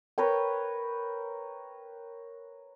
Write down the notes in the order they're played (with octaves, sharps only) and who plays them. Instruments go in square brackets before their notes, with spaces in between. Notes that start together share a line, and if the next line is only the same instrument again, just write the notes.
[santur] A#4 B4 C#5 G5